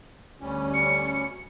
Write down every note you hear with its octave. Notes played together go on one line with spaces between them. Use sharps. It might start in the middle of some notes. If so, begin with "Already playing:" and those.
D2 G3 C#4
C#7